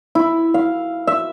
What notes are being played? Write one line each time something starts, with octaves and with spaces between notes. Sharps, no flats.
E4
F5
E5